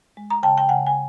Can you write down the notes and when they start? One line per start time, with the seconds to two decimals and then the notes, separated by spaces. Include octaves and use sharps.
0.17 G#3
0.30 A#5
0.43 C#3 G5 A5
0.58 G5
0.69 C#3 F#5 G#5
0.87 G#5